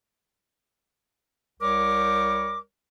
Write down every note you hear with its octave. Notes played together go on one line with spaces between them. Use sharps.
C2 G3 A#4 C#5 D6